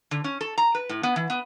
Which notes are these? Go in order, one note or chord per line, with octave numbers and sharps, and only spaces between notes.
D3
C#4
A4
A#5
B4
A2
B3
E3
B3